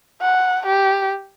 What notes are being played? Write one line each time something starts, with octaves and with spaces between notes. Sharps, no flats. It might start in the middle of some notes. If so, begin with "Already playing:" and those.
F#5
G4